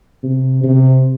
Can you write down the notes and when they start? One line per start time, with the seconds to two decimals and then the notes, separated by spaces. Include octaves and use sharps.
0.24 C3
0.63 C3